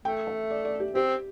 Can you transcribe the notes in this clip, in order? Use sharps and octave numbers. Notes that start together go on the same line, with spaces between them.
A3 G5
E5
D5
D5
G4
C4 G4